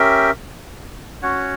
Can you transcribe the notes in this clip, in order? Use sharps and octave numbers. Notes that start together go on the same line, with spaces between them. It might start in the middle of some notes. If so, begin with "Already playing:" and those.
Already playing: C#4 G4 A#4 E5 G5
C#4 F#4 C#5 F#5